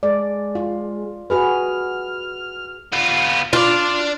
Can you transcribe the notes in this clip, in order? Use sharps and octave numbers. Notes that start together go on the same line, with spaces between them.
G#3 D5
F4
F#4 G#4 B4 F6
B3 F4
D4 F4 D5